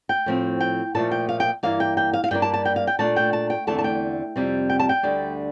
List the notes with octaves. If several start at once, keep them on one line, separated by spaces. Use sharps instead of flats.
G5
A2 F3 C4
G5
A#2 F3 A3 A5
G5
F5
G5
G2 E3 A#3 F5
G5
G5
F5
F5
G2 E3 G3 A#3 D4 G5
A5
A5
G5
F5
G5
A#2 A3 D4 A5
G5
A5
G5
E2 D3 A3 C4 A5
A5
G5
F2 C3 G3 C4
G5
A5
G5
D2 D3 G3 D4